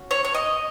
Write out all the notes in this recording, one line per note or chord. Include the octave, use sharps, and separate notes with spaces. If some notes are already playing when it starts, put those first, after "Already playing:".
Already playing: C#4 F#4
C#5
C#5
D#5